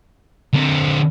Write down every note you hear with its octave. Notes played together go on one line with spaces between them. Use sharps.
D3 C4